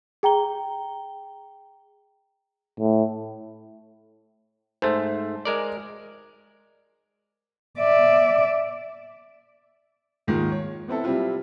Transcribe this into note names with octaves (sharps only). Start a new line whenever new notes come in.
G#4 G5 A#5 G7
A2
G#2 A3 C5
G#3 A#4 D5
D5 E5
D#2 G#2 D#3 F3 G#3 A#3
C#5
B3 C4 E4 A4
C3 F#3 G3 C4 E4 F4